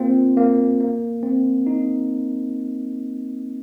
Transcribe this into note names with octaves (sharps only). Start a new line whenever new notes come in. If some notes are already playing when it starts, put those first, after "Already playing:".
Already playing: A#3 C4 F4
A#3
A#3
C4
D#4